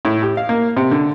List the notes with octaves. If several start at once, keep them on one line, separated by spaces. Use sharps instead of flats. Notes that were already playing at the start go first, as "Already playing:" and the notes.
A2
G4
F5
A#3
C3
D3